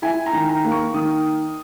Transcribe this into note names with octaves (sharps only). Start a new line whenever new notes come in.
E4 G#5
A#5
D#3
A#5
A#3
C#6
D#3 D#6